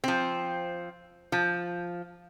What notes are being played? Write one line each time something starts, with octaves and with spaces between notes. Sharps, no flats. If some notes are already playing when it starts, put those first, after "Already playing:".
F3 C4
F3